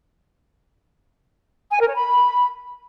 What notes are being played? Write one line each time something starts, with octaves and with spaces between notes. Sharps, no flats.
G#5
A#4
C#5
B5